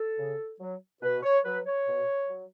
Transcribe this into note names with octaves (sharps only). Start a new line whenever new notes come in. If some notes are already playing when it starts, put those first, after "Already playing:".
Already playing: A4
C#3
F#3
B2 B4
C#5
F#3 B4
C#5
B2
F#3